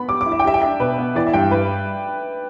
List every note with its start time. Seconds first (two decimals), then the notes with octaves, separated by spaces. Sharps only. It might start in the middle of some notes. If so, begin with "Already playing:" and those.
Already playing: B3 B5
0.08 G4 D6
0.21 D6
0.26 E4
0.32 E5
0.39 G5
0.44 G4 E5
0.54 G5
0.62 D4 E5
0.80 B2 B4
0.98 B3
1.15 E3 D5
1.27 E5
1.33 G2 G5
1.51 G3 B4